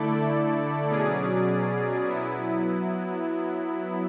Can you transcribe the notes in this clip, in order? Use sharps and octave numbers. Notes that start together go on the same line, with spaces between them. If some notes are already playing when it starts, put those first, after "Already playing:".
Already playing: D3 A3 E4 A4 D5
B2 F#3 C#4 G#4 D5
F#3 B3 E4